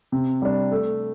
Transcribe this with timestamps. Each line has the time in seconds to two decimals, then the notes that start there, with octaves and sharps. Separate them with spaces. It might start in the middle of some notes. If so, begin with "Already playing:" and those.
0.12 C3
0.42 G3 D4
0.71 A3